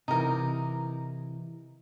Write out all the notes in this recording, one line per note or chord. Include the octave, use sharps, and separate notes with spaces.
C3 E3 D#4 A#4